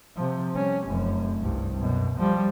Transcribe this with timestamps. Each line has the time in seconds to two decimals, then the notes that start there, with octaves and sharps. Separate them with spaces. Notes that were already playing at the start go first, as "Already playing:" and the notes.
0.16 C3 F3
0.55 G3 C#4
0.86 F1 F#2
1.41 C2 G2
1.80 F#2 B2
2.19 F3 G3